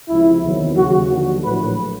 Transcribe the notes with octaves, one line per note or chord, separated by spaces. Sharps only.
C#2 C3 F3 E4
E2 C3 D#3 F#3
D#2 C#3 F#3 F#4
D#2 D3 F3 F#4
A#1 A2 F#3 B4